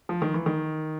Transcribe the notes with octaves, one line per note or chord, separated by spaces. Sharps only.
F3
D#3
E3
D#3